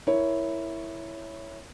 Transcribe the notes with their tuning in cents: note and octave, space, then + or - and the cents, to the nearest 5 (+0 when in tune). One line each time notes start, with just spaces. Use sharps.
E4 +0 A#4 +0 C#5 +0